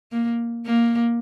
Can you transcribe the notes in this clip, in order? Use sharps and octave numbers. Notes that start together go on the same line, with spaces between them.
A#3
A#3